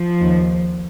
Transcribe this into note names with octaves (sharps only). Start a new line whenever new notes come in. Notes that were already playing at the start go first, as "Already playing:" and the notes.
Already playing: F3
D#2